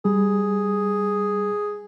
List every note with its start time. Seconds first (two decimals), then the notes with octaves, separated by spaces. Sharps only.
0.05 G3 G#4